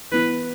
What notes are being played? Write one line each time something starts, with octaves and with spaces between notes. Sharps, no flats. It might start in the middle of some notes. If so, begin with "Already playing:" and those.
E3 B3 E4 B4